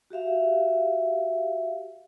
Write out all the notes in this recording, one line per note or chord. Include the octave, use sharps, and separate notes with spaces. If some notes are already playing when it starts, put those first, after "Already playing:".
F#4 G4 E5 F5